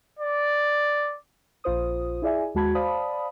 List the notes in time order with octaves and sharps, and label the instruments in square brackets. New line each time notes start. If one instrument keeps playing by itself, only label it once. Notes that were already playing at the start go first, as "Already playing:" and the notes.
[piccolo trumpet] D5
[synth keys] A#1 F4 C5 D#6
E4 G#4 D5 E5 G#5
D#2 G#3 F#4 A5 B5 G#6
C5 D5 F5 A5 B5 D#6